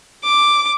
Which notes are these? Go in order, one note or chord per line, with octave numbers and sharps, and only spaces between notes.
D6